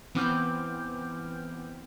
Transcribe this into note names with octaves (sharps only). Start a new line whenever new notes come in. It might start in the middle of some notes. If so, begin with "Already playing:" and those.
E3 B3 C4 D6 F6 G6